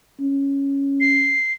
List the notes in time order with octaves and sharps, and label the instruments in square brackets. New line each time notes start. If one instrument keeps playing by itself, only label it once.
[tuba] C#4
[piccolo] C7